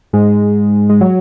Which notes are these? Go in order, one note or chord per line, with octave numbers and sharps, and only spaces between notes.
G#2 G#3
G#3
F#3